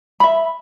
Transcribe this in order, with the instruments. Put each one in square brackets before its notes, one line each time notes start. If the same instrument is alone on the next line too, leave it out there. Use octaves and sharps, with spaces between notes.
[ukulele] E5 B5